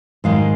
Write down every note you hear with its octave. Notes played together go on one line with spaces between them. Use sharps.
G#2 D#3 G#3 F5